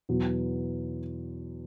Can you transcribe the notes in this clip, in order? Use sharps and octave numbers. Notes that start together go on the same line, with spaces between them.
E2 B2 F#3 B3